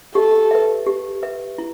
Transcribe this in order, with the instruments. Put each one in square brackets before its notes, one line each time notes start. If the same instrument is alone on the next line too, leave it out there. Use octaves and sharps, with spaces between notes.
[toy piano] G4 [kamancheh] A4
[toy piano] B4 E5
G4
B4 E5
E4